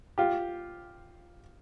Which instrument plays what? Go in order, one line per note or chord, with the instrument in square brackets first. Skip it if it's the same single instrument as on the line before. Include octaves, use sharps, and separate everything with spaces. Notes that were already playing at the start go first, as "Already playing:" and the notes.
[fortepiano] F4 G4